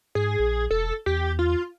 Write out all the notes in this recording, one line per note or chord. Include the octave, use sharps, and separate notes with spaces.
G#2 G#4
A#1
E1 A4
E2 G4
F4